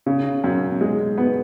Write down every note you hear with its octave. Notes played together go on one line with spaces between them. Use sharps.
C#3
F#2
G#3
B3